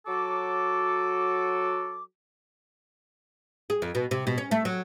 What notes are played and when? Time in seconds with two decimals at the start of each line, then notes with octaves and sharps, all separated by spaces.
0.07 F#3 F#4 A4 D6
3.70 G#4
3.82 F2
3.95 B2
4.11 C3
4.27 B2
4.38 C#4
4.51 A3
4.65 F#3